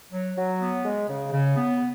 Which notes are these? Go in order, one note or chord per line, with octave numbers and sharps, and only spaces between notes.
F#3
F#3
B3
G#3
C#3
C#3
B3